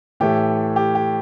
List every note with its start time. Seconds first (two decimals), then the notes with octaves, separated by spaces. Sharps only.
0.20 A2 E3 A3 G4
0.76 G4
0.95 G4